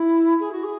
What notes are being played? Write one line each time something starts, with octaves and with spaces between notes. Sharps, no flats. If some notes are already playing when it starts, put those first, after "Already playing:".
Already playing: E4
G#4
F#4
G#4